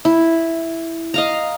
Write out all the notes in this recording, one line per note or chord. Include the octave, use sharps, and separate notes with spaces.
E4
D#5 F5 A#5